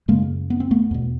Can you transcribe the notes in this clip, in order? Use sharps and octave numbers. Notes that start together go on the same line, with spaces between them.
F#2 C#3 G#3 A#3
B3
C4
A3 B3
E2 B2